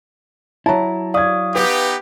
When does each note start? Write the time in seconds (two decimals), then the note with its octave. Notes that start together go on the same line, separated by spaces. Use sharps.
0.66 F#3 E4 A5 A#5
1.14 D5 F5 C#6 D#6 G#6
1.56 B3 D#4 G4 B4